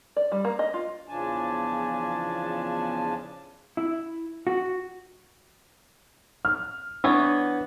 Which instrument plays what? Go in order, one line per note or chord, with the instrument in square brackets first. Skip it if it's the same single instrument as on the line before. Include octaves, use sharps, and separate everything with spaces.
[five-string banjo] D5
G3
A#3
D#5
F4
[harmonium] E2 C#3 F3 D4 G#5 A5
[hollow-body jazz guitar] E4
F#4
[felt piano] F6
[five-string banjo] E3 B3 C#5 [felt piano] D4